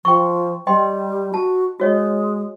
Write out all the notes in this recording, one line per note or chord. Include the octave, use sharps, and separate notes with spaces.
F3 G5 C#6
G3 D#5 G5 C6
F#4 A5
G#3 F#4 C#5 D#5